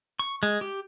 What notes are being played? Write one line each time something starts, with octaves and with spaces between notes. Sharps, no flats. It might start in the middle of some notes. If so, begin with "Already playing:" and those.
C#6
G#3
G4